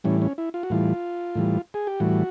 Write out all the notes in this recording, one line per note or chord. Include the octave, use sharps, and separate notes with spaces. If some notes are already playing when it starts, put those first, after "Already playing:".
A2 E3 G3 C#4
C#4
E4
F4
F#4
A2 E3 G3 F4
A2 E3 G3
G#4
G4
A2 E3 G3 F#4